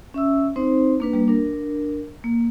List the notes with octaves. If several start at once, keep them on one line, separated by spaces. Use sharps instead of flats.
C#4 E5 E6
C4 D#4 C5
A#3 D4 B4
G3 A#3
D4 A#4
A#3